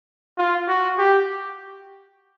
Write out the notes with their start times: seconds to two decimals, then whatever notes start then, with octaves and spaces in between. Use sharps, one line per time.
0.38 F4
0.68 F#4
0.98 G4